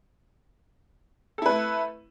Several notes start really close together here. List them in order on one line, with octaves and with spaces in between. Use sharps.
A4 E4 B4 A3